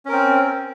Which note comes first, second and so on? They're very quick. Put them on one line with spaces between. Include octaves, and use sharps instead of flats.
C#4 A#4 C4